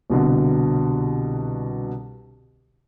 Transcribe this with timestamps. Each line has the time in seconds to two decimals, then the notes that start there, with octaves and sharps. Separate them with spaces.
0.10 C2 B2 D3